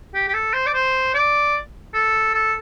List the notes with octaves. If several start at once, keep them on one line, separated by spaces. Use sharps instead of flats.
G4
G4
A4
C5
D5
C5
D5
A4
A4